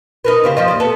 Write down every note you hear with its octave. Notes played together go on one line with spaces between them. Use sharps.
D#4 A#4 B4
C#3 C4 G4
F3 C4 D#5
D#2 G3
B3 A4